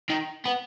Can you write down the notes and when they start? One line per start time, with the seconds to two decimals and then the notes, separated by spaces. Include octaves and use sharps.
0.10 D#3
0.46 B3